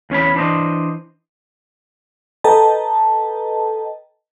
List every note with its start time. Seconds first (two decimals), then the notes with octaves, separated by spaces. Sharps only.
0.10 E2 C#4 C#5 B5
0.35 E3 D4 C5 D#5
2.44 A4 B4 D#5 G5 A5 A#5